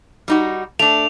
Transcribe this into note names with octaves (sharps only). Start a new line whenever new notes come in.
G3 D#4 F#4
A3 D4 F7